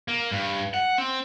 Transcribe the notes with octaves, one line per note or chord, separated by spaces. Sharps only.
A#3
G2
F#5
C4